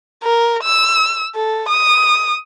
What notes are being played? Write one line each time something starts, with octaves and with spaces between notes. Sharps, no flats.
A#4
E6
A4
D#6